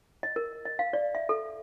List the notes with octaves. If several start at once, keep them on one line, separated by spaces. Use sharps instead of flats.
D#5
A#4
D#5
F5
D5
E5
A4